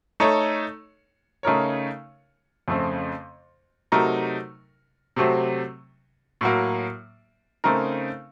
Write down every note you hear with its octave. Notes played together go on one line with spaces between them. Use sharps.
A3 D#4 A4 C#5
C#3 A3 D#4 A#4 C#5
F2 C#3 A3 C4
C3 F#3 A3 D#4 A#4
C3 F#3 A3 C4
A2 F#3 A#3
C#3 A3 C4 D#4 A#4